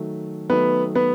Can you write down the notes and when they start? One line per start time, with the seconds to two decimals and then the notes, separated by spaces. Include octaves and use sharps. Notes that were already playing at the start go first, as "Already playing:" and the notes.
Already playing: D#3 F#3 A3
0.50 D#3 F#3 A3 B3 B4
0.95 B3 B4